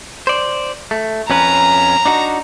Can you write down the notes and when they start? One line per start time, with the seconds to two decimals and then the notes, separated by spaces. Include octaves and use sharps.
0.27 C5 D5
0.91 A3
1.30 F2 C#4 B4 A#5
2.05 D4 D#4 F#4